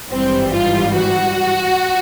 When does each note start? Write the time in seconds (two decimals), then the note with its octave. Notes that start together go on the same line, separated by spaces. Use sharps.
0.11 G#1 G2 E3 G3 C4
0.53 F4
0.94 F#4